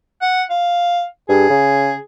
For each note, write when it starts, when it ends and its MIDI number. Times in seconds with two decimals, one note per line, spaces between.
0.22 0.43 78
0.50 1.05 77
1.29 1.48 43
1.29 2.00 68
1.50 1.93 49